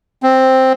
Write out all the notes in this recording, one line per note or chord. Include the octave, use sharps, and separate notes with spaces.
C4